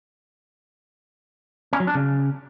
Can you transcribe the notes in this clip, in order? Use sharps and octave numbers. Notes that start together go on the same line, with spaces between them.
C#4
F#3
D4
C#3